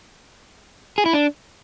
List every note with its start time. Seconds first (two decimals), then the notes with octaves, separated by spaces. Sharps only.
0.98 G#4
1.06 E4
1.13 D4